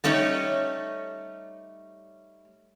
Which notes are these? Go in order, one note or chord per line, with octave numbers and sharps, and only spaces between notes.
G3 A3 C#4 D#4 C#5